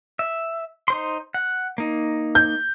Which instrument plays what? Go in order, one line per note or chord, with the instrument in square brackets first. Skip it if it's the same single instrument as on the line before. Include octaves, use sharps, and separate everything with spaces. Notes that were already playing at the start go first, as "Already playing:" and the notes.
[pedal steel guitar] E5
D#4 C5 C6
F#5
A#3 D#4
[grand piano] G6